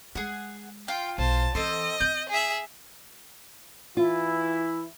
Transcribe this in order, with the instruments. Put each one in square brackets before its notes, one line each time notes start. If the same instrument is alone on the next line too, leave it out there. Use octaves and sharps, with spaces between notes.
[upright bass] G#3 [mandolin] G#4 F#5
[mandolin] F4 [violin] G5
[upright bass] B1 [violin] C5 A5
[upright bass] E3 [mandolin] C4 A4 C5 [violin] D#5
[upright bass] C4 [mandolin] G6
[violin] G#4 E5
[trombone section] E3 E4 [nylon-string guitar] F4